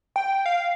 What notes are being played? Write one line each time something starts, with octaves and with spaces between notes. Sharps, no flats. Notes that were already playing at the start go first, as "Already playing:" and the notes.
G5
F5